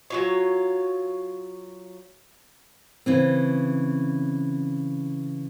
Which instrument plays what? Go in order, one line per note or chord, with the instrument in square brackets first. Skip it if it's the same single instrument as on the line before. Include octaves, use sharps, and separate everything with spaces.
[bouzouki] F#3 F4 C#5
[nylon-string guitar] C#3 E3 C4